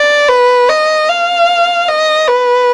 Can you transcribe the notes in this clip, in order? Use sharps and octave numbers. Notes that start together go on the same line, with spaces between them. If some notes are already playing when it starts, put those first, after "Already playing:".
Already playing: D5
B4
D#5
F5
D#5
B4